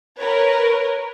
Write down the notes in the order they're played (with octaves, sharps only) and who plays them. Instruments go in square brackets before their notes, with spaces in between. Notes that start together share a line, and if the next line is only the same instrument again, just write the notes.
[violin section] A#4 B4 C#5